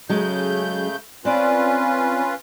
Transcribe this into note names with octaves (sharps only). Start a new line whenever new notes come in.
C#3 F#3 G#3 A3 C#4 G6
C4 C#4 F4 B4 D5